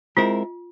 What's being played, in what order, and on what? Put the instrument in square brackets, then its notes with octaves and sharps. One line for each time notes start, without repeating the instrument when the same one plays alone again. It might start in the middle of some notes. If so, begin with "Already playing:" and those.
[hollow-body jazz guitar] G#3 C4 E4 A#4 [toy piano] F4